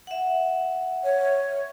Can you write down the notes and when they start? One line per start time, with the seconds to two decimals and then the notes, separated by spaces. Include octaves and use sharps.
0.07 E5 F#5
1.04 C#5